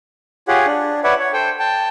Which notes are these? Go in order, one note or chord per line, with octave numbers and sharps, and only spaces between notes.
F4 G4 G#4 C#5 F#5
D4
B4 C#5 D5 E5 F#5
C#5
A4 C5 G5
G5 A5